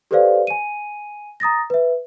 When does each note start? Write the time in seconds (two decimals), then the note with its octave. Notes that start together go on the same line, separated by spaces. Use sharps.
0.11 G4 A4 B4 C5 D5 F5
0.47 G#5 D#7
1.40 A#5 D#6 A6 A#6
1.70 B4 E5